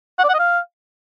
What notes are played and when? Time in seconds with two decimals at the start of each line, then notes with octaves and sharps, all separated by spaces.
0.19 F#5
0.24 D5
0.29 F#5
0.34 D#5
0.39 F5